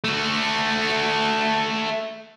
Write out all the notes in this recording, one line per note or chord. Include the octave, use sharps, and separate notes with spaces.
A3 F#4